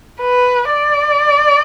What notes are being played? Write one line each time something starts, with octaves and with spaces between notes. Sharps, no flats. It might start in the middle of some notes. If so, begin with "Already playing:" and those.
B4
D5